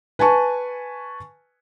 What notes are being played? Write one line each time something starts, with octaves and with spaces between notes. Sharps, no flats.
B4 G#5 A5 C#6